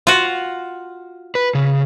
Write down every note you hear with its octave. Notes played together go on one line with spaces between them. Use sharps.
F4 F#4
B4
C#3